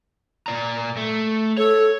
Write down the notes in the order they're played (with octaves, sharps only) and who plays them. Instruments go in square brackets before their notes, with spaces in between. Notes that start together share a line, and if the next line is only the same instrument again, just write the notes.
[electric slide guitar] A#2 D5 A#5
A3
[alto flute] A4 [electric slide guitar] C#5